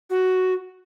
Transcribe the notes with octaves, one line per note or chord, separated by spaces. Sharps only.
F#4